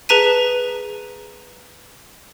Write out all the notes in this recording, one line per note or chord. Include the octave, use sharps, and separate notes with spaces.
G#4 B4 A5 A#5 B6 D#7